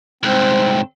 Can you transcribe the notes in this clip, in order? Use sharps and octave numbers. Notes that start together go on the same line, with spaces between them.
C2 G#2 C4